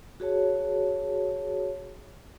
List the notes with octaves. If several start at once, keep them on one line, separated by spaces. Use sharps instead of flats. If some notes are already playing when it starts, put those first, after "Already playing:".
F#4 G#4 C#5 A5